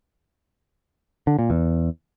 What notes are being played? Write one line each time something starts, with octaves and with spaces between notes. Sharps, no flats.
D3
A#2
E2